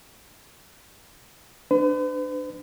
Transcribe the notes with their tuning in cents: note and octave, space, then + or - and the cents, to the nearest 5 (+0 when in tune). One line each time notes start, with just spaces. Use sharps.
D4 +15 B4 +45